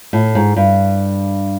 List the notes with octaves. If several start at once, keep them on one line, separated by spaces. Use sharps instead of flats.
A2
G#2
G2